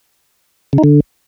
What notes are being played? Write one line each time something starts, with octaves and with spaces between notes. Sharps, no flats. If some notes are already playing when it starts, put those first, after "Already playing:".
C#3
D#4
D3